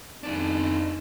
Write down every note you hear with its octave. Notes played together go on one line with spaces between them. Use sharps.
F2 B3 D4 D#4